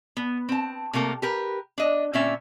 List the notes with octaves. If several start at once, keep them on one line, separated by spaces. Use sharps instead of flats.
B3
C4 A5
C3 A3 A#3 A4 A#4
G4 A#4 B4
D4 D#5
A#2 D3 C4 C#4 D5 E5